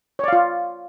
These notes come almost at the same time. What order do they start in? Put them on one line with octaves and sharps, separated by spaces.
C#5 D5 F5 F4